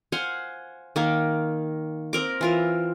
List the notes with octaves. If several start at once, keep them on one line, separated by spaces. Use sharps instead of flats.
C5 F5 F#5 G#5
D#3 A#3
C4 A#4 D6
E3 F4 A#4